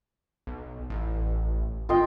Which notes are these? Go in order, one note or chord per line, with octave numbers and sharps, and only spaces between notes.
B1
A1
G1 F4 D#5 G5